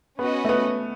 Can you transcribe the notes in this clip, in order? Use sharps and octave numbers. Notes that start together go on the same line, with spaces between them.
B3 C#4 F#4 B4 D#5
A3
B3